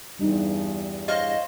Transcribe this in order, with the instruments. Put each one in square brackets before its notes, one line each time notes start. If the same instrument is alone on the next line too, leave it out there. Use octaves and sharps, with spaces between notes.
[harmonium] E2 G2 [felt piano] G3 D#4
[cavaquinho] C5 C#5 F5 [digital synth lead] D#5